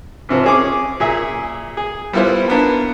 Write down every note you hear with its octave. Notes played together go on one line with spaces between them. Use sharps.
G#2 C3 F3 C4
C#4 G#4 D6
A#2 G#4 E5
G#4
G3 B3 E4 F4 C5
A#3 B3 D4